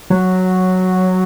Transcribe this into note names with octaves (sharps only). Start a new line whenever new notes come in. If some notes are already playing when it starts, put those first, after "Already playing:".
F#3